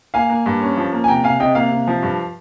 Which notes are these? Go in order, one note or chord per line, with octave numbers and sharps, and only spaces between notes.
A#3 F5 G#5
A#3
G2
C#4
F3
A#3
G#5
C3 G5 A#5
C3 F5 G#5
C3 D#5 G5
A#3 F5
C3
F3
G2